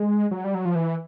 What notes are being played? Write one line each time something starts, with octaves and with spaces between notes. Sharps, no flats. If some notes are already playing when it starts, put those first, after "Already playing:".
Already playing: G#3
F#3
G3
F#3
F3
E3